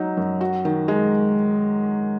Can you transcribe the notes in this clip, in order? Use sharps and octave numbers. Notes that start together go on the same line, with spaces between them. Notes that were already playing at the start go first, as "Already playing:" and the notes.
Already playing: F#3 D#4
F#2
F#4
D#3
G#3